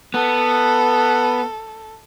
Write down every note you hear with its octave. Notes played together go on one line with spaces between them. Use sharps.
B3 A4